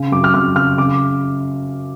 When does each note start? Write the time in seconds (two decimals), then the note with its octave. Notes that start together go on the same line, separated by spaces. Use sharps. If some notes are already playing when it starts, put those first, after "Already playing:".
Already playing: C#3
0.12 F#2 D6
0.24 F6
0.34 F#2 F6
0.56 C#3 F6
0.78 C#3 D6